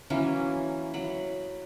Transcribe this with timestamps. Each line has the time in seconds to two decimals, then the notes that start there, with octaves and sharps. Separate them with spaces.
0.10 E3 F#3 A#3 C#4
0.94 F#3 B5